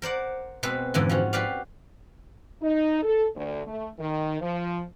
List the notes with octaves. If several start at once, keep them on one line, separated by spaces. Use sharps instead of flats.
A#4 C5 D5 F#5
B2 G#3 C4 A4 B4
F2 G#2 D3 E3
F3 C#4 F#4
F#4 G4 B4 D5 F5
D#4
A4
D2
A3
D#3
F3